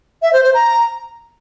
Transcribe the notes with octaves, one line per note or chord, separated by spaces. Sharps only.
E5
C5
C5
A#5